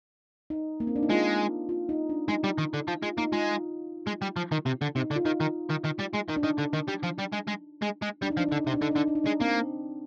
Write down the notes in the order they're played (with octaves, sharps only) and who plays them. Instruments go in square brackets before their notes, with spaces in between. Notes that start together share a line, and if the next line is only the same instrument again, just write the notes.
[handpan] D#4
A#3
C4
D4
D#4
[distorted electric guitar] G#3 [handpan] F4
[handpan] F4
D#4
D4
[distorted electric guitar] G#3 [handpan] D#4
[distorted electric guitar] G3
D#3
D3
F3
[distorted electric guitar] G#3 [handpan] F4
[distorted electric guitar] A#3 [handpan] D#4
[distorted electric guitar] G#3 [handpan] F4
[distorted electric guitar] G#3
G3
F3
D#3
C3
D3
[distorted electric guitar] C3 [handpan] D#4
[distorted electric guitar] D3
[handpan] F4
[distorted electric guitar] D#3 [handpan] D#4
[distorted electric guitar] D#3
D#3
D#3
G3
G#3
D#3
[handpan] D4
[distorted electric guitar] D#3 [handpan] D#4
[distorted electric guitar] D3
D#3
G3
F3
G3
G#3
G#3
G#3
G#3
[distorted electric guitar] G3 [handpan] D4
[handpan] D#4
[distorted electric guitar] F3 [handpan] D4
[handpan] D#4
[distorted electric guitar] D3
[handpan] D4
[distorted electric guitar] C3 [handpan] D#4
[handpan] D4
[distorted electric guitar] D3 [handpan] D#4
[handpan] D4
[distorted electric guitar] D3 [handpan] D#4
[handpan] D4
D#4
[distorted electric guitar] G#3 [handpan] D4
[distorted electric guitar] A#3 [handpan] C4